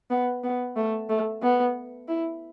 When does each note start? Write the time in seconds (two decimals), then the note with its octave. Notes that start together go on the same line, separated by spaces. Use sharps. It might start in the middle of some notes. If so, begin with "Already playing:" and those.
0.10 B3
0.44 B3
0.77 A3
1.09 A3
1.42 B3
2.09 E4